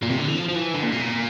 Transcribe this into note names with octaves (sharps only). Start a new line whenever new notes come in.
A#2
C3
D3
E3
F3
F3
E3
D3
A#2
C3
A#2